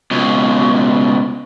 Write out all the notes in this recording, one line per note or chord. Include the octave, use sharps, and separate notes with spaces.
C#2 B2